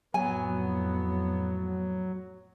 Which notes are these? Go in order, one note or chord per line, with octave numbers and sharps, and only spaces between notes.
F2 A2 F#3 B3 G#5